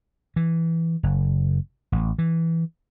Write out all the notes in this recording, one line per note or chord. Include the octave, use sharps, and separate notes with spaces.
E3
F#1
A1
E3